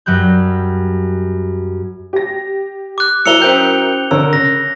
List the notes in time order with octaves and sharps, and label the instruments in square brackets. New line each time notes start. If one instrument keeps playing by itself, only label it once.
[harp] F#2 F#3 G3 F#6 G6
[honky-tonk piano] G4 A#6
[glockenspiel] D6 F#6
[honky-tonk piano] F#3 E4 A#4 [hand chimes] E6 [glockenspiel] C#7 F7 G7
[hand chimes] C#4 C5 G5 [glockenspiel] G6
[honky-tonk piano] D3 A#4 C#5 [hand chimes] E6
[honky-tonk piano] C#3 [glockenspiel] A#6